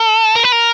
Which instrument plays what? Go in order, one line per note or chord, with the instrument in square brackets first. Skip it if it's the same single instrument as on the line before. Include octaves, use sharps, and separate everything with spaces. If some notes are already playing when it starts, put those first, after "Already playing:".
Already playing: [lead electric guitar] A4
A#4
B4
A#4